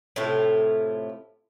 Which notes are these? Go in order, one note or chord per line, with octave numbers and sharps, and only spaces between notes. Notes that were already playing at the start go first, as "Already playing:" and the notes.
A2 C3 E4 F4